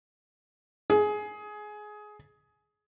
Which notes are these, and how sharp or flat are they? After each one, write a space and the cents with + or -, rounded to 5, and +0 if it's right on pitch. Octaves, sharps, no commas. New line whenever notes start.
G#4 +15